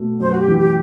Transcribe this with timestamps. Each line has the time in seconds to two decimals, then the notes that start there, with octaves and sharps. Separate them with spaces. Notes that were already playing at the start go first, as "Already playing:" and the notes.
Already playing: B2 A3
0.20 F#2 C5
0.31 F#4
0.39 G4
0.48 E3
0.57 G4